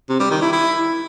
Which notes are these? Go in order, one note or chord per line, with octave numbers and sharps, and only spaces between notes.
C3
G3
D#3
E4
E4